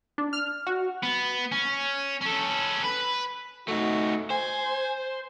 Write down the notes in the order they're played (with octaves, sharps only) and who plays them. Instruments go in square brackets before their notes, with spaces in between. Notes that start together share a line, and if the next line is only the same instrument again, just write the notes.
[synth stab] D4
F6
F#4
[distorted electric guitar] B3
C#4
C#4 A4
B4
[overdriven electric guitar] A3 D#4 [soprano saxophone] F#4
[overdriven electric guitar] C5 [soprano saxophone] G#5